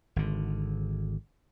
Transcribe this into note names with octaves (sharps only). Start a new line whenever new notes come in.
G#1 D3